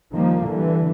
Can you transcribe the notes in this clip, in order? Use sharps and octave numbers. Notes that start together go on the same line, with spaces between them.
D#3 F3 G3 A#3
D3 E3 G3